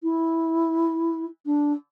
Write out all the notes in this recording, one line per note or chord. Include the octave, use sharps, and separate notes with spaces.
E4
D4